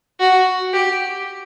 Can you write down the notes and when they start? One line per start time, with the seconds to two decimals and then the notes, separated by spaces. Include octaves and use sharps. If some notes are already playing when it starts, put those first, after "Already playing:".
0.20 F#4
0.73 G4